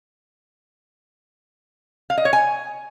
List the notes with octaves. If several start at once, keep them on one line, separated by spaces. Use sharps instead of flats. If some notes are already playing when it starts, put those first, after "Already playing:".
F5
D#5
C#5
G#5